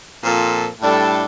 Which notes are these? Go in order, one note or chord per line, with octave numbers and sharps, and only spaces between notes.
A#2 F3 C4 F4 A4
A2 G3 D4 A4